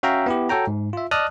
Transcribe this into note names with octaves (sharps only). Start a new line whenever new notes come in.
C#4 F#4 E5 F5 G5 A#5
B3 E4 G4
F#4 A4 C#5 G5 A#5
G#2
F4 E5
D5 D#5 A5 D#6 F6 F#6